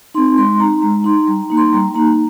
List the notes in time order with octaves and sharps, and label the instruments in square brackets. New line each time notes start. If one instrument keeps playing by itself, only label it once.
[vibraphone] C4 D#4 C6
G#3 C6
D#4 A#5
G#3 A#5
D#4 C6
G3 A#5
A#5
A#3 D#4
C6
G3 A#5
A#3 D#4 A#5